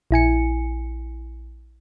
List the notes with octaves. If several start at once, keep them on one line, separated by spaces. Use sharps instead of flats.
A#1 E4 G#5 C#7